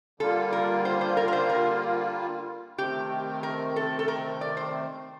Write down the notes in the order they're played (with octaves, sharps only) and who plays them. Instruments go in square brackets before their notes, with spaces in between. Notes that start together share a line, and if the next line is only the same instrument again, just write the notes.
[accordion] D3 G3 A#3 F4 [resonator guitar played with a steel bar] A4
[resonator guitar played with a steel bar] A#4
C5
C5
A#4
A#4
C5
A#4
[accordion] C3 D#3 A3 C4 [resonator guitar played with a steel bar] G4
[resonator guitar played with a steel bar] A#4
A4
A4
A#4
D5
C5